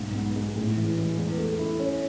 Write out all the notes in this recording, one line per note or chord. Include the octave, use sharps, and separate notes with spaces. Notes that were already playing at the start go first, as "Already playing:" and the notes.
Already playing: B1 G#2
B3
G#3
A2
E3
G#3
E2
A3
E4
C#4